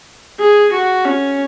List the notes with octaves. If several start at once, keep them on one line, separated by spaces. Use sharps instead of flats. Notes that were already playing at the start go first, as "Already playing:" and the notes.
G#4
F#4
C#4